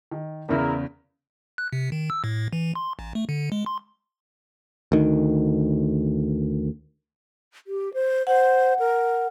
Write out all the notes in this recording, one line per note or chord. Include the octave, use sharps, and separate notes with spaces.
D#3
E2 C#3 E4 A#4
F#6
C3
D#3
E6
A2
E3
C6
A1
A3
D3
G#3
C6
D2 D#3
G4
C5
C5 F#5
A#4